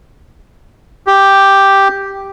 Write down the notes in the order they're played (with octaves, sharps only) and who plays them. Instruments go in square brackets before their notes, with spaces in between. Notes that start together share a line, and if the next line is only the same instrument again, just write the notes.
[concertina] G4